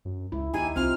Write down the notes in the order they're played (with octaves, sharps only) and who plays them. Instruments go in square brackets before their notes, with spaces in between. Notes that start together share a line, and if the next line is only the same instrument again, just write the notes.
[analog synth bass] F#2
[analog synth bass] C#2 [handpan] E4
[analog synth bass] D#2 [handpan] D#4 G4 E5 [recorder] G#5
[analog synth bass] C2 [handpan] C4 D#4 F4 [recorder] F6